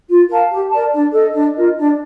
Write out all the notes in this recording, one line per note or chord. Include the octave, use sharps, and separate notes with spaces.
F4
A#4 F5 A5
G4
A#4 D5 A5
D4
A4 D#5
D4
F4 A#4 D#5
D4